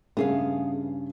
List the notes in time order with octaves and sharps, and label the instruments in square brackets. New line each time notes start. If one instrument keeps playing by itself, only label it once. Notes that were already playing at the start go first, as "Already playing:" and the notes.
[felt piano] G2 C#3 C#4 [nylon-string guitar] B3 G#4 F5